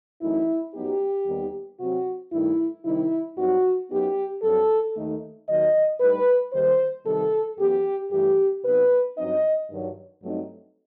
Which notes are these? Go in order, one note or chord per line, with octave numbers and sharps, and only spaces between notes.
F#2 E3 A3 D#4 E4
F#2 F#3 B3 D#4 G4
D#2 D#3 G3 B3 D#4
C3 F#3 C4 F#4
G2 D#3 A3 D#4 E4
C3 D#3 G3 D#4 E4
G2 F#3 C4 D#4 F#4
F#2 F#3 B3 D#4 G4
G2 F#3 C4 A4
D#2 D#3 A3 D#4
D#2 D#3 F#3 D#5
A2 G3 D#4 B4
D#2 D#3 G3 D#4 C5
C3 D#3 G3 A4
F#2 E3 B3 G4
G2 E3 A3 G4
C3 F#3 B3 D#4 B4
G2 F#3 C4 D#4 D#5
G2 D#3 F#3
G2 F#3 A3 C4 D#4